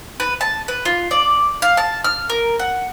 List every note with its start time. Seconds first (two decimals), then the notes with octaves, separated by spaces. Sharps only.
0.20 B4
0.41 A5
0.68 B4
0.85 F4
1.11 D5
1.62 F5
1.77 A5
2.04 F6
2.30 A#4
2.60 F#5